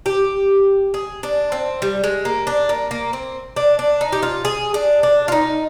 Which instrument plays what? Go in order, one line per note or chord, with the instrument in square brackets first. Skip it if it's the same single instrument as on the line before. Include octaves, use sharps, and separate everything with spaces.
[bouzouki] G4
G#4
D4
C4
G3
G#3
A#3
D4
A#3
A#3
C4
D4
D4
D#4
G4
F4
G#4
D4
D4
F4
D#4